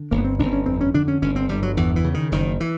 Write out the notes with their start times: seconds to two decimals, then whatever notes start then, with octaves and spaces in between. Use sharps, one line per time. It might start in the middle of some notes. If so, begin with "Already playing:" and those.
Already playing: D3
0.11 G1 A#3
0.18 B3
0.24 C4
0.39 G1 D4
0.46 C4
0.53 C#4
0.66 F2 C4
0.81 C#4
0.94 D3 D4
1.08 C#4
1.22 G1 C#4
1.36 C4
1.49 G1 G3
1.63 F#3
1.77 E2 E3
1.96 E3
2.04 C#3
2.14 D#3
2.32 F#1 D#3
2.60 E3